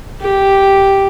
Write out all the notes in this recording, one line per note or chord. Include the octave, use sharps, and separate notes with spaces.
G4